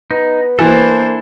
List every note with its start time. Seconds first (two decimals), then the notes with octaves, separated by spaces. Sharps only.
0.11 B3 D#4
0.59 E3 A#3 D4 E4 A4 C5